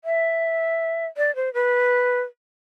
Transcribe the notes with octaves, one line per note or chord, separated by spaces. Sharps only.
E5
D5
C5
B4